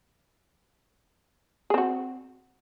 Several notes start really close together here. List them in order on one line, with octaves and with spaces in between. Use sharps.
G#4 C4 F#4